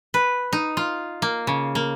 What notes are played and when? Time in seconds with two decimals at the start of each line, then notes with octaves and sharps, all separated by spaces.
0.14 B4
0.53 D#4
0.77 F4
1.22 A#3
1.47 C#3
1.75 A#3